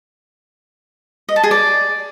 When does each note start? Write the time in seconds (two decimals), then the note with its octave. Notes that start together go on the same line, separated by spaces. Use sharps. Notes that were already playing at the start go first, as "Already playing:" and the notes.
1.29 D#5
1.36 A5
1.43 G#4
1.51 D5